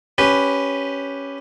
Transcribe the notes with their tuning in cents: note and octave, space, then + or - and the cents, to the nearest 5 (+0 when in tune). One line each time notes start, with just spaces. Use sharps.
C#4 +0 G4 +0 B4 +0